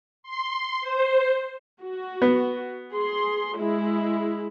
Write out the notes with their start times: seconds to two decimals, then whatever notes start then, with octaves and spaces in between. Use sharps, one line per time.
0.23 C6
0.81 C5
1.83 F#4
2.22 B3
2.94 G#4 C6
3.59 G#3 E4